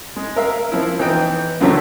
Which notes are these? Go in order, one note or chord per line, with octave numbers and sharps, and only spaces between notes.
G#3
A#4 E5 F5
A#4
F3 E4
E3 B3 D#4 G5
C#2 F#2 D3 F3 F#3 A3